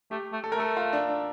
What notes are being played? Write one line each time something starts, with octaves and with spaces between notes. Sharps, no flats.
A3 G4
A3
A4
A3 A#4
A4
F4
D4
D4